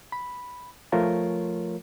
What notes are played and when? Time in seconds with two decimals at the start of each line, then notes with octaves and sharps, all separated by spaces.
0.12 B5
0.92 F3 A3 F4 A#4 C#5